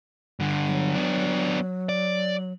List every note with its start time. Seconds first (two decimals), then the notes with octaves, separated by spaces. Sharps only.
0.40 G2 D3
0.67 F#3
0.95 B3 D4
1.89 D5